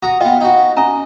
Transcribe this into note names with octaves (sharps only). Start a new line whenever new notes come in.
F#4 A#5 D#6
B3 F4 D#5 G5
D#4 F#4
C#4 D#5 G#5 A#5